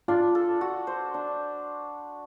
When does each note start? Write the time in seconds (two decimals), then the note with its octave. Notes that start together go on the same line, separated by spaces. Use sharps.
0.08 D4 F4
0.35 A4
0.61 F#4
0.87 C5
1.14 D4